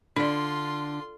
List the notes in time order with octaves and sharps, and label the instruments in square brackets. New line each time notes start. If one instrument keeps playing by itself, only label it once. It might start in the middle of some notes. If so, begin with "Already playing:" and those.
[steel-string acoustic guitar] D3 [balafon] D4 D5 [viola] F4 C6